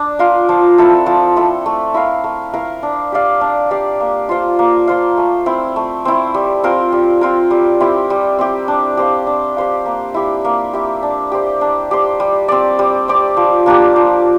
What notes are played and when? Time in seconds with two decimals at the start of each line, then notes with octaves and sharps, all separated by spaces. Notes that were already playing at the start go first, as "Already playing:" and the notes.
Already playing: D4
0.19 F4 A#4 F5
0.49 F3
0.78 C4 E4 A4
1.06 F3
1.36 C4 E4 A4
1.66 A3
1.94 E4 A#4 F5
2.24 A3
2.53 E4 A#4 F5
2.83 D4
3.12 G4 D5 F5
3.41 D4
3.71 G4 D5 F5
4.00 A#3
4.29 F4 C5 F5
4.59 A#3
4.88 F4 C5 F5
5.18 A3
5.46 C4 E4
5.76 A3
6.05 C4 E4
6.34 G3
6.64 C4 F4 A#4
6.92 G3
7.21 C4 F4 A#4
7.51 G3
7.80 C4 E4 G4
8.10 G3
8.39 C4 E4 G4
8.68 D4
8.97 G4 C5 F5
9.27 D4
9.57 G4 C5 F5
9.86 A#3
10.14 E4 G4
10.45 A#3
10.73 E4 G4
11.03 D4
11.32 G4 C5
11.61 D4
11.91 G4 C5
12.20 G3
12.48 C4 G4 D5
12.79 G3
13.08 C4 G4 D5
13.37 F3
13.66 A#3 D4 G4
13.96 F3